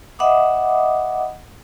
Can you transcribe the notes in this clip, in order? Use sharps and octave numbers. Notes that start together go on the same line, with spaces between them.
D#5 E5 F#5 B5 D6 D#6